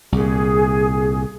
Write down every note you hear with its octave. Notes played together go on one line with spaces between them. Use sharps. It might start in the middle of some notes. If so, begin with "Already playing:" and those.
C2 A#2 G#4